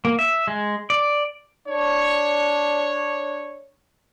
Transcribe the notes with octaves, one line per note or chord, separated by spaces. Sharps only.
A#3
E5
G#3
D5
D4 C#5